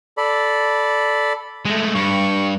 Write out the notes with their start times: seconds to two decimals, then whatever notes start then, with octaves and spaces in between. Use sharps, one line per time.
0.17 A4 D5 B5
1.65 G#3 A3
1.94 G2 C#6